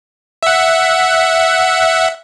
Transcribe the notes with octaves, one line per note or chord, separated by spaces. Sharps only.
E5 F#5